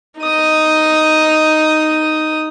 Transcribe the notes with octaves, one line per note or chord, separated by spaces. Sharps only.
D#4 D#6